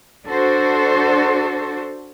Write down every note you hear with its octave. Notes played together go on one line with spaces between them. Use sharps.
D4 F#4 A4 C5